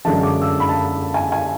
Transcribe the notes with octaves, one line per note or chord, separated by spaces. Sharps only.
F#2 D3 G#3 A5
D6
E6
B5
A5
G#5
G#5